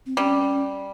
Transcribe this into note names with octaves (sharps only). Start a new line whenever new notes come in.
C4
G3 C#4